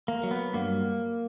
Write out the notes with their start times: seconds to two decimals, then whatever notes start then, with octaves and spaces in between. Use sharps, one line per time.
0.08 A#3
0.23 F#3
0.31 B3
0.53 G2 A#3